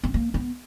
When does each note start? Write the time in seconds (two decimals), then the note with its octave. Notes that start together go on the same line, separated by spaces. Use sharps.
0.04 B3
0.14 A#3
0.34 B3